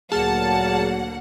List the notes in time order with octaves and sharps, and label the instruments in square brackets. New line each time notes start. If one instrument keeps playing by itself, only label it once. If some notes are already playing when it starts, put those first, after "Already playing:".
[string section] D2 A#3 F#5 [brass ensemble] A#2 F#3 [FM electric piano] G#4 F6 [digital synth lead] A5